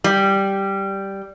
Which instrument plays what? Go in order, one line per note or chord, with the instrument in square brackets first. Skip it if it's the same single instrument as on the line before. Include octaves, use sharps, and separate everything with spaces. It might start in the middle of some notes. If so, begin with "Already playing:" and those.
[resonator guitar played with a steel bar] G3